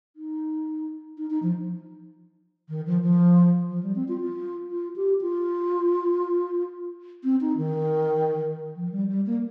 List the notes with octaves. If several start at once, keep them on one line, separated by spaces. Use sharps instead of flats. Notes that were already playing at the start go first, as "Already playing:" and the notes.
D#4
D#4
D#4
F3
D#3
F3
F3
F3
G3
C4
F4
F4
F4
G4
F4
C4
D#4
D#3
F3
G3
G3
A#3